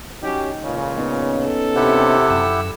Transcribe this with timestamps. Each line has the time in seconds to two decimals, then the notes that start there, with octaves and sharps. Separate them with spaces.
0.23 F#3 C#4 D#4 G4
0.64 C#2 A#2 C#3
0.98 B3 C#4 D#4
1.45 A4
1.76 C3 E4 G4 F#5
2.30 F#2 E6